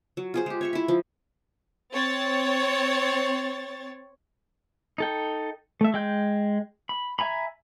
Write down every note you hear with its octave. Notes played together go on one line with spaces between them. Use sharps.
F#3
F4 G#4 C5
G#3 G4
C#5 E5 C#6
E4 E5
F3
C4 C#5 A6
D#4 A4 G5
A3 E5
G#3 G5 G6
B5
E5 G#5 A#5 B5